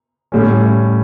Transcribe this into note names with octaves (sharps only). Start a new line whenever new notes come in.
A2 G3 C#4